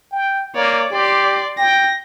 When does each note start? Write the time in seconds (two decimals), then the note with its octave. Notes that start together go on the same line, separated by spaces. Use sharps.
0.12 G5
0.55 A#3 C#5 D5
0.91 G4 D5 C6
1.59 G5 A#6